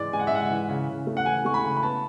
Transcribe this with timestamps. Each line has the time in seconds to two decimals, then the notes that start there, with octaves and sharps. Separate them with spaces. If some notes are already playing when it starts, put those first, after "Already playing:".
Already playing: G#2 E3 G#3 D5
0.13 G#3 G#5
0.20 F#5
0.27 E5
0.31 G#2 F#5
0.51 E3
0.69 C#3
0.89 C#3
1.07 A3
1.17 F#5
1.26 E3 G#5
1.45 A3 C#6
1.54 B5
1.65 C#3
1.77 B5
1.83 B3 A5